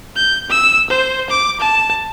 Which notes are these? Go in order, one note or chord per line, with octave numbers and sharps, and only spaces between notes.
G6
E6
C5
D6
A5